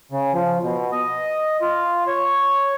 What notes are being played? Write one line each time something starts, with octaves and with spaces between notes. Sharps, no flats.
C#3
F3
B2
D#5
F4
C#5